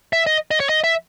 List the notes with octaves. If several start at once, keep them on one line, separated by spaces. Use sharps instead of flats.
E5
D#5
D#5
C#5
D#5
E5